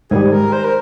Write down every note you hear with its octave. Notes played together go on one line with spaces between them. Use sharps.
G#2 D#3 G3 G#4
A#4
C5
A#4